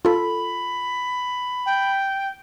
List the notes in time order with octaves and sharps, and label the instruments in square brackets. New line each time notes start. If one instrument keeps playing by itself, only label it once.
[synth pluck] F4 A4 [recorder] B5
[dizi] G5